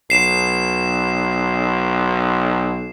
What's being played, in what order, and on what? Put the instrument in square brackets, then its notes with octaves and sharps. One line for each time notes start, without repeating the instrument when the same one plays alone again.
[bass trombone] B1 [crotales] C7 E7